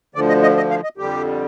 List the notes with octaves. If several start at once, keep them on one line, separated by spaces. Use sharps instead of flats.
D2 D3 F3 D5
D#5
D#5
D#5
F5
D#5
F2 D3 G3 G4